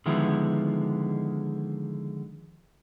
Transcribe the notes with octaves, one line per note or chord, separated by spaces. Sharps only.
D3 D#3 F3 G#3 B3 E4